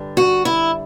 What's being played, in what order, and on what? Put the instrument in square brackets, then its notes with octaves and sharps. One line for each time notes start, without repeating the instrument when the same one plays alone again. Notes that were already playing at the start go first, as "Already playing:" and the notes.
Already playing: [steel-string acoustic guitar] G2 D3 G3 D4
F#4
E4